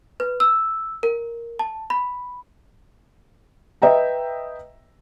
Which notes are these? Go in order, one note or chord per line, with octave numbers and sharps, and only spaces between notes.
B4
E6
A#4
A5
B5
B4 D#5 E5 G5 A#5